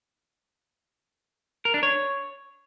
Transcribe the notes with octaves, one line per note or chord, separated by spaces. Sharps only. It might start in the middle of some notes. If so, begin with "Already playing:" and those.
A#4
D4
C#5